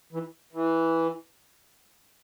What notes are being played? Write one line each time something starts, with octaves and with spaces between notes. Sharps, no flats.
E3
E3